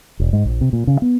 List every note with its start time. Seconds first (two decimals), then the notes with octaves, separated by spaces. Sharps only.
0.20 E1
0.33 G#2
0.45 A#1
0.61 C3
0.73 A#2
0.87 C#3
1.02 B3